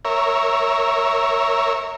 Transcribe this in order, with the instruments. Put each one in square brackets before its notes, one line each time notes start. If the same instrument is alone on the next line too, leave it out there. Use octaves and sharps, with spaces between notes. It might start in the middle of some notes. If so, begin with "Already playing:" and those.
[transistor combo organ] A#4 C#5 E5